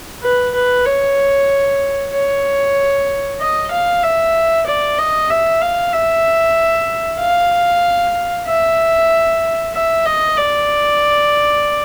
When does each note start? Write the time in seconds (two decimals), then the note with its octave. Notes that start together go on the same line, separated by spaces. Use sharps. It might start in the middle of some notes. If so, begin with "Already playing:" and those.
0.23 B4
0.55 B4
0.86 C#5
2.13 C#5
3.40 D#5
3.71 F5
4.03 E5
4.66 D5
4.98 D#5
5.30 E5
5.62 F5
5.93 E5
7.20 F5
8.47 E5
9.74 E5
10.05 D#5
10.37 D5